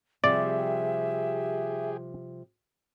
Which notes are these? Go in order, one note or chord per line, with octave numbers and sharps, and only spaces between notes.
C3 F3 G3 G4 G#4 D5 E5